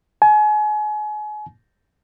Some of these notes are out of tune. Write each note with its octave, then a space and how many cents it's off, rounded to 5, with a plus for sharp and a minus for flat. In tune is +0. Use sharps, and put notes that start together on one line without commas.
G#5 +35